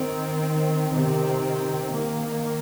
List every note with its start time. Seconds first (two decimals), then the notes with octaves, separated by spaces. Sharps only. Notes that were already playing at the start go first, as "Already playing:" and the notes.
Already playing: D#3 C4
0.92 C3 D#3 C4
1.92 D#3 A#3